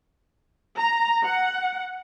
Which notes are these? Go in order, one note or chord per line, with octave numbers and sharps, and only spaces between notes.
A#5
F#5